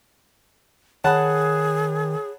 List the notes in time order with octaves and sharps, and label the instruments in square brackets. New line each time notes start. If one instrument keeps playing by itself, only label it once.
[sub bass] D#3 [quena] G#4 [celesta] C#5 B5 F#6 [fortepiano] F#5 A5